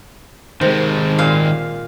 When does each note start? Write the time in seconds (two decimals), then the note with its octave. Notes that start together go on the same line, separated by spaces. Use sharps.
0.61 C3 D#3 G#3
1.19 A#2 F5